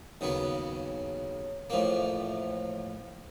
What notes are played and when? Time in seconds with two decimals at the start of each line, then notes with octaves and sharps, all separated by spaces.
0.21 D#2 C#3 F#3 B3
1.70 A1 A2 F3 A#3